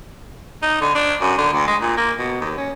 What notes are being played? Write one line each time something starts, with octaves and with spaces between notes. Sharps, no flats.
D#4
D3
D4
F#2
D3
D2
G#3
A#2
A#3
B2
D#2
C#4